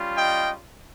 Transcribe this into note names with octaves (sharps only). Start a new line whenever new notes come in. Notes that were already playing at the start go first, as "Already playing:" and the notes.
Already playing: G3 C#4 F4
D#5 G5